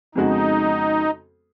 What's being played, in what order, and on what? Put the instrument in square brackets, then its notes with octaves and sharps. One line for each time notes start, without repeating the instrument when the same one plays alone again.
[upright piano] F2 C#3 G#3 B3 F#4 [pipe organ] D#4